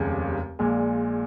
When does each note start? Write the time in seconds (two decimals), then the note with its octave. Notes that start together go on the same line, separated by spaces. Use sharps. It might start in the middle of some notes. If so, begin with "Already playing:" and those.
Already playing: F1 D#2 C#3 G#3
0.59 A#1 A#2 G#3